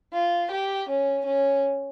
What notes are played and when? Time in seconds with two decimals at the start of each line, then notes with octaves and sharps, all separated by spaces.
0.14 F4
0.51 G4
0.89 C#4
1.26 C#4